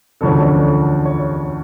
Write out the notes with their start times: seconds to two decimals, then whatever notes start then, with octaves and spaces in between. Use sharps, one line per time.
0.21 E1 D2 D3 F3 C#4 A4
1.05 C#5